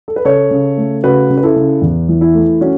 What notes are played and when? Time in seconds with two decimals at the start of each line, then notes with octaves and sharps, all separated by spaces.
0.08 A4
0.16 B4
0.25 C#3 A4 C#5
0.51 C#3
0.77 A3
1.04 C#3 F#4 B4
1.31 C#3
1.37 B4
1.43 E4 A4
1.56 C#3
1.82 E2
2.09 E3
2.21 E4
2.34 A3
2.61 C#4 F#4